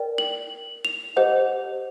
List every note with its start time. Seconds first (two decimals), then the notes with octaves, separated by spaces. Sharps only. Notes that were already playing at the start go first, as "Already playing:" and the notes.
Already playing: A#4 D5 G5
0.18 F#7
0.85 F7
1.16 G4 C5 D#5 F#5